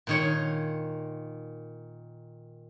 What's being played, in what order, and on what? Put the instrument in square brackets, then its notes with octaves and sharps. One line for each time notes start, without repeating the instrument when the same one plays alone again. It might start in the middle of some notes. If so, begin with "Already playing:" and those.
[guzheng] A#2 D#3 C#5